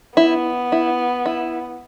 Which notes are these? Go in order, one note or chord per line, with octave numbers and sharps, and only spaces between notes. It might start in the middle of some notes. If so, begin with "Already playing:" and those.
B3 E4
E4
E4